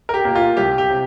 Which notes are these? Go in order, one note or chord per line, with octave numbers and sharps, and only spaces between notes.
A#4
G4
A#2 A#3
F4
C2 G4
G4
C3